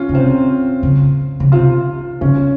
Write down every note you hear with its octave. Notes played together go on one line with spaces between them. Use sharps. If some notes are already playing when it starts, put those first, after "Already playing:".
Already playing: C#4 F4
C#3
C3 C4
C#3
C#3
C3 F4
C#3 C#4